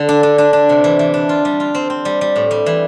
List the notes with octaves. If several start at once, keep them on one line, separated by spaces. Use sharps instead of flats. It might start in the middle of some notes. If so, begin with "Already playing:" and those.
Already playing: D3
D4
D4
D4
D4
C3
E3
E3
D4
F4
G3
F4
C4
C4
G3
G3
A2
G3
E3